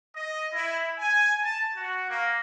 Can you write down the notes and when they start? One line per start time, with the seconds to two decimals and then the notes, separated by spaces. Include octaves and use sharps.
0.16 D#5
0.53 E4
0.99 G#5
1.43 A5
1.75 F#4
2.10 A#3